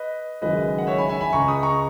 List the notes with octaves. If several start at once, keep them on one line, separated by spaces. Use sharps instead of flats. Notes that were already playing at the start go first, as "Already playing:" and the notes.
Already playing: B4 D#5
F#1 F#2 D#3 G#3 B4 D#5
F#5
C#5 E5
G#5 B5
E5 G#5
G#5 B5
C#2 C#3 G#3 A#5 C#6
B5 D#6
A#5 C#6